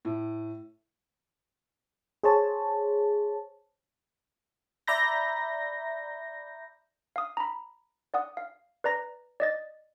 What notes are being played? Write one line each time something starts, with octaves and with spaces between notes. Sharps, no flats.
A2
G#4 C5 C#5 A5
D5 E5 A#5 B5 G6 A#6
F5 D#6
A#5 B5
D5 F#5 D#6
F5
B4 D5 A#5 A#6
D5 D#5 A6